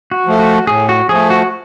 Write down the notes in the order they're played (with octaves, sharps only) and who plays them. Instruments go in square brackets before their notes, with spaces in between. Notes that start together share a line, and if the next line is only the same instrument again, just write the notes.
[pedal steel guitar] F#4
[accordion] F3 A3
[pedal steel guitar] F#4
[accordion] A2 [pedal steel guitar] G#4
[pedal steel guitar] F#4
[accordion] F3 A3 [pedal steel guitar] G#4
[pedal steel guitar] F#4